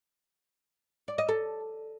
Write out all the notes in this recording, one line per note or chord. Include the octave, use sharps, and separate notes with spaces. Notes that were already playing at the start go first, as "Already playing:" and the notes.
D5
D#5
A4